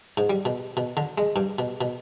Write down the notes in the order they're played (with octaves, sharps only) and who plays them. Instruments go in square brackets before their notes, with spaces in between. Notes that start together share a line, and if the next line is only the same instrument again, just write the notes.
[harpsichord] G#2
G3
B2
B2
D3
G#3
G2
B2
B2